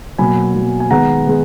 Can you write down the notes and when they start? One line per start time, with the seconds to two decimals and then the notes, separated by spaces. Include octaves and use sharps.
0.18 B2 F#3 A#3 G#5 B5
0.54 B2 F#3 A#3
0.80 G#5
0.90 D#3 G#3 B3 F#5 A#5
1.26 D#3 G#3 B3